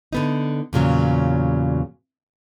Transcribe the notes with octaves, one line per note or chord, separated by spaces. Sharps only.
D3 B3 D#4
E2 A#2 C#3 F#3